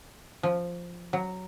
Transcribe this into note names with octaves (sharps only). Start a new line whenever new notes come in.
F3
F#3